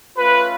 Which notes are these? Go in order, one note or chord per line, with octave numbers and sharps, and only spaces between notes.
A3 C#4 F4 B4